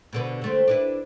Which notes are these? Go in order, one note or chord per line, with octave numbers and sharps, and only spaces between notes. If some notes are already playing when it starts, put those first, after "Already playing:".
B2 D3 B4
D3 A3 C4
D4 E4 B4